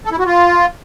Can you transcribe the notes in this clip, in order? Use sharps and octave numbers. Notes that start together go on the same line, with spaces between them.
A4
E4
F#4
F4